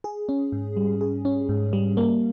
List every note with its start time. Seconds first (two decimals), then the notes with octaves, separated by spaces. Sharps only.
0.04 G#4
0.29 C#4
0.52 G#2
0.77 G3
1.01 G#4
1.25 C#4
1.49 G#2
1.73 G3
1.97 A#3